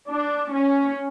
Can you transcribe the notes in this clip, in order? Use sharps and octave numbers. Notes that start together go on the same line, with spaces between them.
D4
C#4